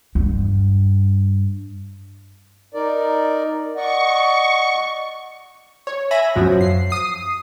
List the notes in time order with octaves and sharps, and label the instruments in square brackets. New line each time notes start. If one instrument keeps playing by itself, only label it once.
[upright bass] G2
[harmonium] D#4 A#4 D5
[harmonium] D5 D#5 F#5 [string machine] C#6
[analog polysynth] C#5
E5 G#5 B5 A#6
F#2 F3 F#3
C7
D#6 C7